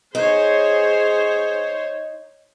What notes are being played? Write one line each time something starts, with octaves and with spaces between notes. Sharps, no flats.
D#4 G#4 C5 C#5